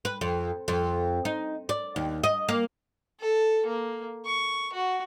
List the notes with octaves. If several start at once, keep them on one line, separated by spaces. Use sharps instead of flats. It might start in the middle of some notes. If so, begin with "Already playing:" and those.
B4
F2
F2
D#4
D5
D#2
D#5
A#3
A4
A#3
C#6
F#4